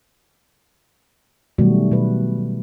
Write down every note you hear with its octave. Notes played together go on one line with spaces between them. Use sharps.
B2 D#3 F#3 G3 A3 F#4
B2 B4